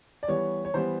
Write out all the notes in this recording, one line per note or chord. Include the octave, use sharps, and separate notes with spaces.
D5
E3 G3 B3 C#5
C#5
E3 G3 B3 C5